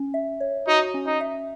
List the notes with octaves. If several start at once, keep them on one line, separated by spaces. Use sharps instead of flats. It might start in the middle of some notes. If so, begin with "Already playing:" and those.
Already playing: C#4
E5
C#5
D#4 F#4
C#4
D#4
E5